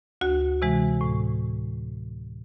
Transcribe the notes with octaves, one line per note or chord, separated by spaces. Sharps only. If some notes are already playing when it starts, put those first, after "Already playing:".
D2 F#4
C3 E3 G#3
A2